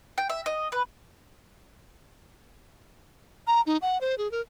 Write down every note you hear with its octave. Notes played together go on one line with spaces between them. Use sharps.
G5
E5
D#5
B4
A#5
D#4
F#5
C5
G#4
A#4